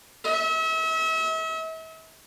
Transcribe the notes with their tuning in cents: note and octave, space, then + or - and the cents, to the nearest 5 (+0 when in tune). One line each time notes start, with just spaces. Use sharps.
E5 -40